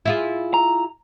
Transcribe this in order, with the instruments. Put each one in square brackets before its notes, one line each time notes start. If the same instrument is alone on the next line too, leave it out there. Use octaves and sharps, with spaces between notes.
[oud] E4 F4 G#4
[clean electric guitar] A#5